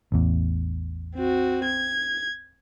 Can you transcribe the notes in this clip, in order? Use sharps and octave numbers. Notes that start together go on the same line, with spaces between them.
A1 E2
C4 F#4
G#6